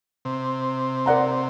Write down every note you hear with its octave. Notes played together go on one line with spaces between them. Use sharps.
C3
A#4 D5 F#5 A#5